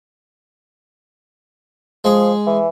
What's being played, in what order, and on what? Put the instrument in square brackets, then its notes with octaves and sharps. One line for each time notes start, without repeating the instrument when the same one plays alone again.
[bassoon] F3 [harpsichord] G#3 G#4
[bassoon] E3